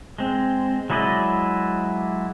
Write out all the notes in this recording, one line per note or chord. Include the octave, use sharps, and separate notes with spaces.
G#3 C4
F#3 G#3 E4 D5 D#5